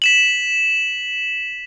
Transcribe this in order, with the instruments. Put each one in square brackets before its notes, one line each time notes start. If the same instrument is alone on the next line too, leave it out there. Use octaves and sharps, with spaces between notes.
[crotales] B6 E7 F#7